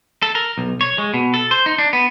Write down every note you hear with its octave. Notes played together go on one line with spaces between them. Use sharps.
A4
A#4
B1
C#5
G#3
B2
A4
C5
D#4
D4
B3